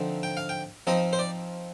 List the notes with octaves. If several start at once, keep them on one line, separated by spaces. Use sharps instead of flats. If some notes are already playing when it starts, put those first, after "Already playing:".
Already playing: D3 F3 C4 D#4
G5
F5
G5
F3 C4 D#4 D#5
C5
D5